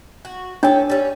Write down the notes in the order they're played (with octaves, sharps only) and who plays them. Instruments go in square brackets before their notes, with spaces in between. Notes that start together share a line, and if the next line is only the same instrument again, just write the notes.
[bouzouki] F#4
[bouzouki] C#4 A4 [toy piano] D4 G5
[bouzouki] G3 C#4